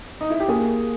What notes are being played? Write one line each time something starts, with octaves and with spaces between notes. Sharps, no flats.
D#4
E4
G4
A#3 G#4